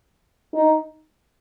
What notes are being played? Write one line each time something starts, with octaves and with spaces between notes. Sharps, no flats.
D#4